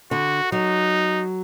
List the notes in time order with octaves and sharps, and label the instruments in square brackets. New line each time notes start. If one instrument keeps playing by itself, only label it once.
[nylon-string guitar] D3 [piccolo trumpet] F#4
[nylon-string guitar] F#3 [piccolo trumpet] D#4